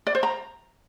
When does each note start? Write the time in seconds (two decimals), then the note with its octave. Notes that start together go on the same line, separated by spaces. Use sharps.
0.07 D5
0.15 C5
0.23 A#5